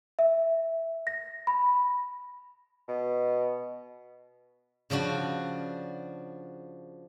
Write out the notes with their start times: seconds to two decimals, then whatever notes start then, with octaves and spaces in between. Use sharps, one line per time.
0.19 E5
1.07 A#6
1.47 B5
2.88 B2
4.90 C#3 F3 D4 F#4